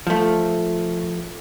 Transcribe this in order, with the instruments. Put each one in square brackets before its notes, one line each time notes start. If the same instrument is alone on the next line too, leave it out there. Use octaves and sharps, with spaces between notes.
[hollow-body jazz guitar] F3 A3